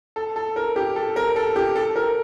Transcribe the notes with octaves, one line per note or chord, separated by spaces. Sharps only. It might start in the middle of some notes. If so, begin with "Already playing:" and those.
A4
A4
A#4
G4
A4
A#4
A4
G4
A4
A#4